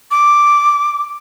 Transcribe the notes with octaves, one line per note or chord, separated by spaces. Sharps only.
D6